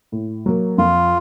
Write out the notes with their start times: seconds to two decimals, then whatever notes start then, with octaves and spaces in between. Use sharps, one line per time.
0.12 A2
0.46 F#3 A#3
0.78 F2 F4